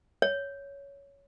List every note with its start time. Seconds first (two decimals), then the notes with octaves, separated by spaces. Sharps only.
0.22 C#5